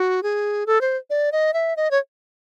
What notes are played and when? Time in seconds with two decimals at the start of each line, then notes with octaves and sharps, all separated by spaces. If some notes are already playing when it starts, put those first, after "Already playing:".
Already playing: F#4
0.23 G#4
0.66 A4
0.81 C5
1.10 D5
1.32 D#5
1.54 E5
1.77 D#5
1.91 C#5